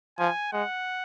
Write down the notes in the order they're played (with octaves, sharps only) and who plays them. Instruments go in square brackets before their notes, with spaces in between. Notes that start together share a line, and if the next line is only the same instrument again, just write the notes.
[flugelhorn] F3 [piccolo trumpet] G#5
[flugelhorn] G#3 [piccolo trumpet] F#5